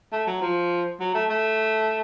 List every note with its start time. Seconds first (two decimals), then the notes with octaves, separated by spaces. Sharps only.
0.13 A3
0.27 F#3
0.41 F3
1.00 F#3
1.14 A3
1.29 A3